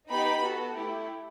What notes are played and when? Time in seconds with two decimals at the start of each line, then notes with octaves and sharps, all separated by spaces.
0.10 B3 D#4 G4 B5
0.42 B3 F#4 A4
0.74 A3 E4 G4